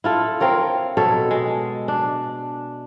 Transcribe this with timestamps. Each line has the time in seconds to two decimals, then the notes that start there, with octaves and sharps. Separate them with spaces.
0.04 E4 F4 A4
0.40 C4 F4 A#4 C#5
0.97 B2 A4 C#5
1.31 G#3
1.88 D4